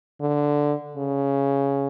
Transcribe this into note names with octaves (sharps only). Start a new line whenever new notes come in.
D3
C#3